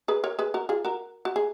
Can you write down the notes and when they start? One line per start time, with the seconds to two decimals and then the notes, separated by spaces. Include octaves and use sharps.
0.08 G#4 B4
0.24 A#4 C#5
0.39 G#4 B4
0.54 F#4 A#4
0.69 F4 G#4
0.85 F#4 A#4
1.25 F#4
1.36 G#4